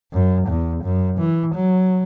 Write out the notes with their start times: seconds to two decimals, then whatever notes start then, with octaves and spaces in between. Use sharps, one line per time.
0.13 F#2
0.48 E2
0.84 F#2
1.19 E3
1.55 F#3